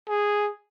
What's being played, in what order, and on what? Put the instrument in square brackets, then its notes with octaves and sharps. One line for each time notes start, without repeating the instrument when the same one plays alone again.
[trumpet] G#4